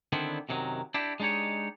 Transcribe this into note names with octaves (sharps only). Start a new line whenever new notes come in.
D3 D#3 B3 C4 D4 E4
F#2 C3 D#3 F#3
D4 E4 G4
G#3 D4 D#4 G4 C#5